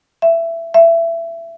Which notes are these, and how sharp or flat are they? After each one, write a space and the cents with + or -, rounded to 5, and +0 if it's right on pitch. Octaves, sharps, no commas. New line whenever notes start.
E5 +15
E5 +20